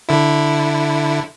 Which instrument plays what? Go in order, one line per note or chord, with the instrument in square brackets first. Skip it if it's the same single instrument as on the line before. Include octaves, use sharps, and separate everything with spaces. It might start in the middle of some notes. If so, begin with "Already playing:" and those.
[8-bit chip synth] D3 E4